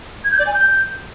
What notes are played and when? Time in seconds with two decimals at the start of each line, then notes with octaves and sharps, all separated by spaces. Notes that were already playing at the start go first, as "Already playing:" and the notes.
0.24 G#6
0.32 G6
0.39 D5
0.46 G#5
0.54 G6